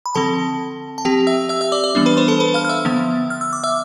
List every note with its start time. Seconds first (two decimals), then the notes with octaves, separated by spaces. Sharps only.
0.06 B5
0.15 D3 F3 C4 A4 A5
0.98 A5
1.05 F3 C4 G4 G5
1.27 E5 E6
1.49 E5 E6
1.61 E5 E6
1.72 D5 D6
1.83 D5 D6
1.95 E3 G3 B3 D4
2.06 B4 B5
2.17 C5 C6
2.28 A4 A5
2.40 B4 B5
2.54 F5 F6
2.65 F6
2.69 E5 E6
2.85 D3 F3 B3
3.30 F6
3.41 E6
3.53 D6
3.64 E5 E6